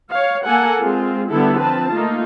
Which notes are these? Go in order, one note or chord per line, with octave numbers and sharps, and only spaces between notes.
C#5 F5
A#3 A4 F#5 G#5
G#3 C4 F4
D3 G3 B3 E4 A4
F3 C4 B4 A5
A3 A#3 D#4 F4